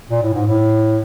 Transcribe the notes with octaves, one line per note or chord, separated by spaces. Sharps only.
A#2
A2
G#2
A2